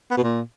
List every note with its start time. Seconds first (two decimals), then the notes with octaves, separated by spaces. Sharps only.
0.11 B3
0.17 B2
0.23 A#2